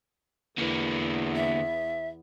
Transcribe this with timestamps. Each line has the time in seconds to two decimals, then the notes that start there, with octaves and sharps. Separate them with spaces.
0.58 E2 D3 A#3 B3
1.35 E5